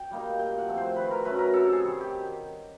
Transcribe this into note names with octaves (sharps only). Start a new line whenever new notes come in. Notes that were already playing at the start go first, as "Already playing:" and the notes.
Already playing: G5
G3 A#3 D#4
A#2 G5
F#5
F3 A3 C4
C5
D#3 B4
A#4
F#3 A3 C#4 B4
A#4
C3 A4
G#4
D#3 G3
G4